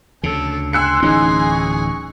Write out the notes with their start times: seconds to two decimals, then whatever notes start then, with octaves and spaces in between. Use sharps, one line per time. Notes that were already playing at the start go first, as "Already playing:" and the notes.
0.23 D2 C#3 A4
0.73 G#5 C6 E6 F#6 C#7
1.03 D1 E3 C#4 D#4 G#4 G#5
1.50 C#6